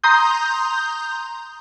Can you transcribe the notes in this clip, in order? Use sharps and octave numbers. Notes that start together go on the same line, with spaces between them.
A#5 C6 D#6 G6